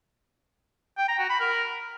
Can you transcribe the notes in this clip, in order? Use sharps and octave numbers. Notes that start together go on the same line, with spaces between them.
G5
A#5
F#4
B5
A#4